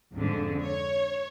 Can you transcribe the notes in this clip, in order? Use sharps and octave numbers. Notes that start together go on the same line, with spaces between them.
F2 G#2 D3
C#5